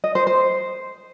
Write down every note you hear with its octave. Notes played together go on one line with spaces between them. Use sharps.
D#5
C5
C5